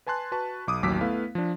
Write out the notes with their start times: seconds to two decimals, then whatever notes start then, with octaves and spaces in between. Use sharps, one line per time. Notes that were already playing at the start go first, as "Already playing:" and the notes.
0.07 B4 G#5 A5 C6 F#6
0.32 F#4 B4 A5 C#6
0.67 B1 D6 D#6
0.83 A1 D#2 F#3 D6 E6 B6
1.01 A3 B3 E4 B4 F5
1.35 F3 D4